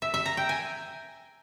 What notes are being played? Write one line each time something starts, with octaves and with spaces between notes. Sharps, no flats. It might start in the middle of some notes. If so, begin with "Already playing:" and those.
E5
E5
A#5
G5
G#5